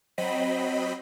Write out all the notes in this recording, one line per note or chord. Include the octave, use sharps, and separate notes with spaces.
F#3 C4 D#5 B5